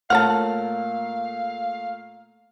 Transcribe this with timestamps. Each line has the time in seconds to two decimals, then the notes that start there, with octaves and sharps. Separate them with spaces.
0.10 A#2 A3 A#3 C#5 F5 F#5 A5 F6